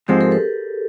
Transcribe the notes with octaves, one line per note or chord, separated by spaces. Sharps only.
G#2 F3 G#3 C4 G4 A4
G#4 A#4
A4 B4